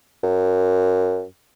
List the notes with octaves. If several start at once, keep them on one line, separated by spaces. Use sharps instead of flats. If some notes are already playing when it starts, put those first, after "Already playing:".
F#2